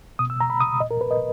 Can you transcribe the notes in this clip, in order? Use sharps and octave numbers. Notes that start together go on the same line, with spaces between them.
B2 D#6
E6
A#5
B5
D#6
A#2 D#5
A#4
B4
D#5